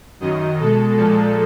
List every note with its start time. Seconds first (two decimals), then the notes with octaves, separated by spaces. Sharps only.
0.20 F#2 D#3 F#3 D#5
0.59 B2 G#3 A4
0.97 A#2 F3 G#3 A4